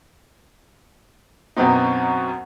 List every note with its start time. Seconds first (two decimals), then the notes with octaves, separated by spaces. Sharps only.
1.57 F#2 B2 F#3 B3 C4 D#4